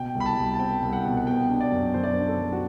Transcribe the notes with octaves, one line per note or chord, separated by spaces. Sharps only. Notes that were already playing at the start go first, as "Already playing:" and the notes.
Already playing: B2 G5
C2
B5
A5
C2
A5
C4 G5
C2
G5
F#5
B2
F#5
B3 G5
D4
D5
F#2
F#3 C5
D5
D4 C5
A4
F#3
F#4